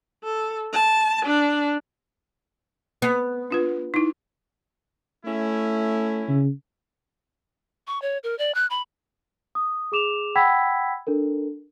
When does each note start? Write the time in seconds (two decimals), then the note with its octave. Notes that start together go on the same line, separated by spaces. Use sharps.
0.24 A4
0.73 A5
1.26 D4
3.02 B3
3.51 D4 F4 B4
3.94 D#4 E4
5.25 A3 C#4 E4
6.29 C#3
7.87 C#6
8.02 C#5
8.23 A#4
8.38 D5
8.55 F#6
8.70 B5
9.55 D#6
9.92 G#4 D6 E7 F7
10.35 F#5 G5 B5 E6 G#6 B6
11.07 D4 A4 A#4